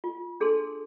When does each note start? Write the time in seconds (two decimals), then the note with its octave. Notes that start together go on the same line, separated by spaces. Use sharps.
0.04 F4
0.40 D4 G#4 A4 A5 C6